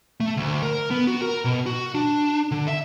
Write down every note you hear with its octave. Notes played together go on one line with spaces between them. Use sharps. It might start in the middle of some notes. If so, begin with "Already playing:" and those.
A3
D2
A#4
B3
F#4
A#4
B2
F#4
D4
D3
E5